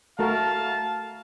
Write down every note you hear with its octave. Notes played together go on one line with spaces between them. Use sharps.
A3 F#4 A#4 F5 A5